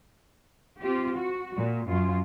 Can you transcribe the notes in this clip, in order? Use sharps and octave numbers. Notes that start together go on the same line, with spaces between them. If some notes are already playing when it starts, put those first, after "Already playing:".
C4 F4 G4
F#4
A#2
F#2 F4